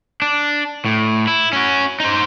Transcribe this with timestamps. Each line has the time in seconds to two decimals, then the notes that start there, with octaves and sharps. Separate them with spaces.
0.22 D4
0.85 A2
1.28 E4
1.53 C#4 F#4
2.00 D#4 C5